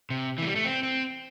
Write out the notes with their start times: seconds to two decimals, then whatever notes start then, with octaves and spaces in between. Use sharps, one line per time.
0.10 C3
0.38 E3 A3
0.47 G3
0.56 A3
0.65 C4
0.83 C4